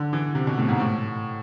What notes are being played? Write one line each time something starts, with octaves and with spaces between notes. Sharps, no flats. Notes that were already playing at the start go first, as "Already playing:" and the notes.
Already playing: D3
E3
C3
B2
A2
G#2
A2